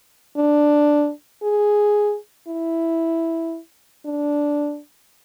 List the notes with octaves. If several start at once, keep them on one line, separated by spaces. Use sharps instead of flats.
D4
G#4
E4
D4